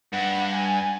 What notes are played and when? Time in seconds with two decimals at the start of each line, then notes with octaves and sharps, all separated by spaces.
0.13 G2 F#5
0.55 G#5